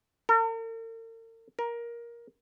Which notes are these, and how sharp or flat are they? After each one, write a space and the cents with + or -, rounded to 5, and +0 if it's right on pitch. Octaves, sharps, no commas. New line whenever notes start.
A#4 -45
A#4 +15